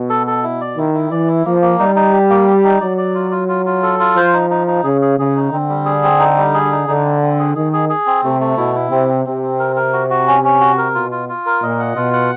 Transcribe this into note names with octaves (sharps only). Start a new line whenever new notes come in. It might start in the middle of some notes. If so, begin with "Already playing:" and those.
Already playing: B2
A4
A4
E4
D5
D#3 E4
E4
E3 D5
E4
F3 A#3
A#3
G3 D#4
D#4
G4
A#3
G4
D#4
F#3 D5
D5
F4
F4
F4
F4
A4
F4
F3 C5
D#4
D#4
D#4
C#3 G#4
G#4
C#3 G#4
D#4
D3 C4
G3
G#4
C4
D#4
G3
G#4
D#4
D3 D#4
C4
C4
G#4
D#3 G#4
G#4
G#4
C4
C3 A3
A3
B2 E4
E4
C3 C4
C4
C3 C4
C4
A#4
A#4
F#4
F#4
C#4
C#4
F#4
A#4
B2 F4
F4
F4
A#4
A#2 D#5
F#5
B2 F4
F#5